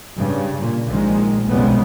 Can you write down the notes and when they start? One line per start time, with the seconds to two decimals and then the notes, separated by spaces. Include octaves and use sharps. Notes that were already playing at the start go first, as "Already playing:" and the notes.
0.16 G2 C#3
0.59 A#2
0.89 A#1 D#3 G#3
1.48 B1 F2 C#3 G3 G#3 B3